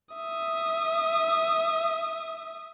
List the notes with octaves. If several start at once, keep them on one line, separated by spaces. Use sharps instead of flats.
E5 D#6